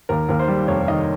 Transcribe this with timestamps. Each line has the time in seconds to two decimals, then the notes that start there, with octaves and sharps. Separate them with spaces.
0.09 D#2 A#4
0.29 D#2 A#4
0.39 C5
0.48 G3
0.67 F1 C#5
0.88 D#3 D#5